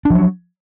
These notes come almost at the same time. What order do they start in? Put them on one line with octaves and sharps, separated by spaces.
D4 F3 F#3